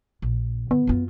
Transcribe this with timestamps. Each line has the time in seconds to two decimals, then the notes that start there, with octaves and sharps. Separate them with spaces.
0.22 A#1
0.71 D3 B3
0.87 F#2 F4